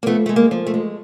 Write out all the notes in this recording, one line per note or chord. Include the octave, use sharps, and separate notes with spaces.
A#3
F3 A3 B3
G#3 A3
A#3
F3
A3
G#3